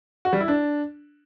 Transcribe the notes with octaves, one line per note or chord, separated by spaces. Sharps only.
F#4
G3
E4
D4